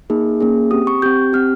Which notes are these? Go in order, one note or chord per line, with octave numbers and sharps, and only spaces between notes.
A#3 D#4 G#4
A#3 C#4 G#4
C4 G4 D#6
C#6
C4 G4 G6
C4 G4 F6